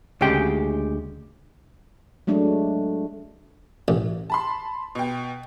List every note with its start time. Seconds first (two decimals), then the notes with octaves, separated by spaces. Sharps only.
0.21 D2 C#3 G#3 G4 G5
2.27 F#3 G#3 A3 D4
3.88 A1
4.30 A5 B5 C6
4.95 B2 G5